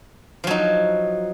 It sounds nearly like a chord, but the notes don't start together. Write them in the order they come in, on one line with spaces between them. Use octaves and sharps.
F3 F#3 D#4